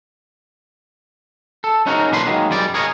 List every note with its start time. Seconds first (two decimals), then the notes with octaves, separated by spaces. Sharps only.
1.64 A4
1.86 C#4 D#4 F#4 G#4 A#4
2.11 B1 A#2 D4 B4 C6
2.26 D#3 F#3 G#3 A#3
2.50 F#2 G3 G#3 D5
2.74 G#4 A#4 C#5 D#5